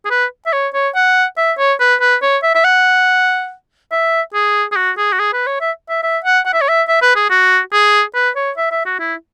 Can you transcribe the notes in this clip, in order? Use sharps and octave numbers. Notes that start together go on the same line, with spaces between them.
G#4
B4
E5
C#5
C#5
F#5
E5
C#5
B4
B4
C#5
E5
E5
F#5
E5
G#4
G#4
F#4
G#4
F#4
G#4
B4
C#5
E5
E5
E5
F#5
F#5
E5
C#5
E5
E5
B4
G#4
F#4
G#4
B4
C#5
E5
E5
F#4
E4